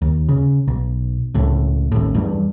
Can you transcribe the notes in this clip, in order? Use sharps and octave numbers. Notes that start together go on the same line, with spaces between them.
D#2
C#3
B1
C#2 A2
A1 D#2 A2
E2 G2